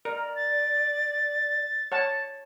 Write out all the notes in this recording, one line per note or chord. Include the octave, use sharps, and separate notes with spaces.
A#4 D5
A6
C#5 F#5 A5